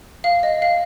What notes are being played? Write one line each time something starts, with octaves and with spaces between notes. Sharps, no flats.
F5
D#5
F5